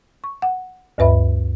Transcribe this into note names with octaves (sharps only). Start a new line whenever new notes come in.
C#6
F#5
D2 G2 B4 E5 B5